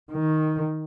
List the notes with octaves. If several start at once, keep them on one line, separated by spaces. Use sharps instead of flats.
D#3